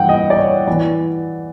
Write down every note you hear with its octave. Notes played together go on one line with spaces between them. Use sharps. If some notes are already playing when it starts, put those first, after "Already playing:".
Already playing: G2 E3 F#5 G5
D#5
D5
C#5
E3 D5